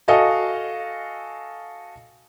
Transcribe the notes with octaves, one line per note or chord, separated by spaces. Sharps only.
F#4 A4 D#5 F5 G#5